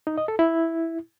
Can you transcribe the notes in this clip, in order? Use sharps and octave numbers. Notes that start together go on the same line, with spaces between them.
D#4
D#5
A4
E4